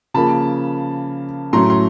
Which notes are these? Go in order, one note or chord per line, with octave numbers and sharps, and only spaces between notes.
C#3 F3 A#3 A5 B5
A2 F#3 A3 C#4 A#5 C6
C6